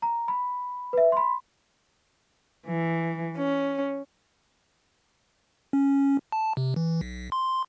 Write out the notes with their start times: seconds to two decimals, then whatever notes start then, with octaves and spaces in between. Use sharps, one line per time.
0.02 A#5
0.28 B5
0.93 B4 E5
1.12 B5 C6
2.67 E3
3.36 C#4
5.73 C#4
6.32 A5
6.57 C3
6.76 E3
7.01 B1
7.32 C6